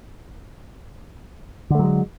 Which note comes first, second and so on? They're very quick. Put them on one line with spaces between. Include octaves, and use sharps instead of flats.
D3 A3 F#3 G#3